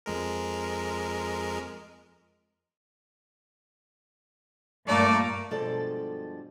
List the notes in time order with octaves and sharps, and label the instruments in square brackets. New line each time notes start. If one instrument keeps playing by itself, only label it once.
[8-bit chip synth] F2 G#3 A#4
[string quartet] G2 A#2 A#3 [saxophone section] A3 D5
[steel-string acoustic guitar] G2 B2 F3 G#3 A4 D5